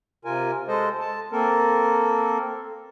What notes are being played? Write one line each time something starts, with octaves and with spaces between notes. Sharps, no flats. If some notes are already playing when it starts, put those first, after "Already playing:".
C3 F4 A#4 G#5
G#3 A4 C5 D#5
A5
A#3 C4 A4 A#4